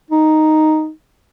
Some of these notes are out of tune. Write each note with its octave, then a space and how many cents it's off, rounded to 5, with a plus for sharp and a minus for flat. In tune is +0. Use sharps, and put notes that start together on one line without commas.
D#4 +0